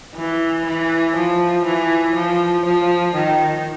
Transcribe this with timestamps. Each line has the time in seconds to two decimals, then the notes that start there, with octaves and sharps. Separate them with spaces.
0.16 E3
0.66 E3
1.15 F3
1.65 E3
2.14 F3
2.65 F3
3.14 D#3